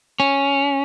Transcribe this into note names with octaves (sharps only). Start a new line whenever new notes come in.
C#4